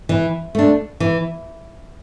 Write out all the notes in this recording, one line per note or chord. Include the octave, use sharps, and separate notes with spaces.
E3
A3 D4
E3